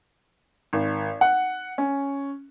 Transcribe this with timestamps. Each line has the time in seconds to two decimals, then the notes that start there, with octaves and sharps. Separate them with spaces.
0.73 G#1
1.21 F#5
1.78 C#4